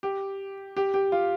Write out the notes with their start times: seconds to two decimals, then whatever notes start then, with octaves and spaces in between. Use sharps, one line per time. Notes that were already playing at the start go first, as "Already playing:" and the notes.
0.03 G4
0.77 G4
0.94 G4
1.12 F4